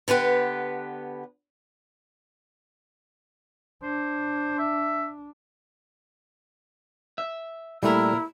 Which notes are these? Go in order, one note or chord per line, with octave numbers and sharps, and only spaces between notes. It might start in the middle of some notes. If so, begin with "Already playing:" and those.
D3 B3 G4 B4
D4 C5
E5
E5
A#2 G3 A3 E4 A#4